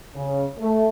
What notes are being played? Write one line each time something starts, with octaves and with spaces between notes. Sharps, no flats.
C#3
A3